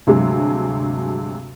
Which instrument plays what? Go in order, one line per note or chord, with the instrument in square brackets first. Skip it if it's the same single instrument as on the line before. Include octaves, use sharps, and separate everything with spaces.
[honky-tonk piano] D2 G2 C3 F#3 G#3